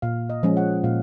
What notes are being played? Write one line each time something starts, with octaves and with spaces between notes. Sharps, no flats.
A#2 F5
D#5
F3 G#3 C#4
F#5
A#2 F5